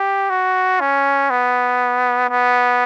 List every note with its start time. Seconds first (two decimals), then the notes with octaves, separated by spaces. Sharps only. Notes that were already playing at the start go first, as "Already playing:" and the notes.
Already playing: G4
0.30 F#4
0.80 C#4
1.30 B3
2.30 B3